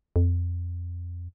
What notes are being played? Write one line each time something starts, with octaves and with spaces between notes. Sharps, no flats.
F2